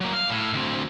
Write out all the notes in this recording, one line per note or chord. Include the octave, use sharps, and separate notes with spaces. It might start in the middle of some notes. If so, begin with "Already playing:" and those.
F#3 A#3
F5
A2
D2 C4